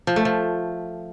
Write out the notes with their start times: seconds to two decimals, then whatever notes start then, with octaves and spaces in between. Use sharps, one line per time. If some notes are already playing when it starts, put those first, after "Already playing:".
0.07 F3
0.16 A3
0.25 F3